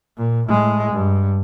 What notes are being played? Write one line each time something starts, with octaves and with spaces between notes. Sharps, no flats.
A#2
A2 G#3
G2